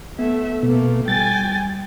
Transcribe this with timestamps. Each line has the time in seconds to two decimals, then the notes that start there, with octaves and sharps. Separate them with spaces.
0.19 A3 B3 E5
0.63 B2 A3 A#3
1.08 G3 G5 G#5 A6